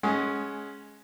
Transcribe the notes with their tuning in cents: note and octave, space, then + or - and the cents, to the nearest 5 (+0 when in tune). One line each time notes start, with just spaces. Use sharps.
G#3 +15 C#4 +0 F#5 +10